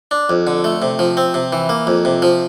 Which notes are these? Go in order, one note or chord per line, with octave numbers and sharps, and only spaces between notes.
D4
F2
D3
A3
C3
F3
C4
C3
E3
A#3
F2
C3
F3